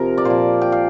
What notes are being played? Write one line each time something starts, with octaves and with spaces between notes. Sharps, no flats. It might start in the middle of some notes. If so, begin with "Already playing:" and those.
Already playing: C3 F3 A#4
D5
A#2 F3 C5
G5
F5